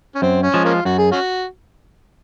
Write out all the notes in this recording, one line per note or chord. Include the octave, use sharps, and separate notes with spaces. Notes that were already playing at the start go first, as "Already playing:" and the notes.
C#4
F#2 C4
C#4
F3 G#3
A#3 C#4 F4
F#2 F#4
G#4
C#4 F#4